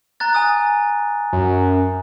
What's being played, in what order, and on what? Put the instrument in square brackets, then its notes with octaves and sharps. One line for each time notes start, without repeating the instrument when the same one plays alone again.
[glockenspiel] A#5 F#6 A6
G#5 D#6 A6
[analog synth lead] F#2